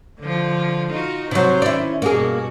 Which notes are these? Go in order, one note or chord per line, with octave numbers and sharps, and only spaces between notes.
D3 F3
D#4 F4 F#4
C3 F#3 F#4 C5
D#3 C#4 E4 D5
G2 B2 A#3 F#4 G#4